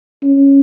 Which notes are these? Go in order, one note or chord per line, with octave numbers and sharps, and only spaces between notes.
C#4